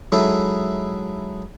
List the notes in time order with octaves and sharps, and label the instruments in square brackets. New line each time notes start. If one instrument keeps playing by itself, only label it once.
[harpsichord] F#3 G#3 D#4 E4 A4